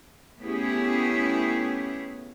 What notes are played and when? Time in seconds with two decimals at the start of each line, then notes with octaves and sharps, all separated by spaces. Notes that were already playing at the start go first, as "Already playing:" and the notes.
0.41 A3 B3 C#4 E4 G4 G#4